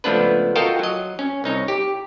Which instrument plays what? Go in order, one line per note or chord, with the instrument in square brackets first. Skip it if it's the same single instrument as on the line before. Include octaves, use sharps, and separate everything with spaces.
[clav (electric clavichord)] C#2 F3 A3 B3 D4 B4
F4 F#4 A4 A#4 D#5 G5
F#3 D#5
C#4
C2 D#4 C#5
G4